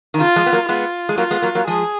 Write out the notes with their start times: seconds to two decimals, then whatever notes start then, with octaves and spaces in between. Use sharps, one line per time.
0.14 D#3
0.20 C#3 F4
0.36 F3 G#3
0.46 B3
0.52 F#3 A#3
0.69 G#3 B3 F4
1.09 G#3
1.18 F#3 A#3 F4
1.31 G#3 B3
1.42 F#3 A#3
1.55 F#3 A#3
1.67 F3 G#3 G#4